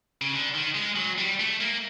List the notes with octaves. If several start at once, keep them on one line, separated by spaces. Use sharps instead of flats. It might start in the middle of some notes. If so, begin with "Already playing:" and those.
C#3
D3
D#3
G#3
F#3
G3
A3
A#3